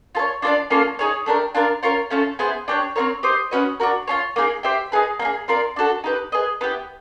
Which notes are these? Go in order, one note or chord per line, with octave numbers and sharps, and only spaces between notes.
F4 A4 C#5
D4 F4 A4 D5
A#3 C#4 F4 A4
D#4 G#4 C#5
A3 D4 G4 A#4
D4 F4 A#4
C#4 F4 A#4 C#5
A3 C#4 F4 A4
B3 E4 G#4 C5
D4 G4 A#4 C#5
C4 F4 A#4 C#5
G4 C5 D#5
C#4 F#4 B4 D#5
D4 F#4 A#4
F4 G#4 C#5
A#3 D#4 G#4
G4 C5 E5 G5
D#4 G#4 B4
A#3 D#4
G#4
C4 F4 A#4 D5
D4 F#4 A4
D#4 G4 B4
G#4 B4 D#5
B3 E4 G4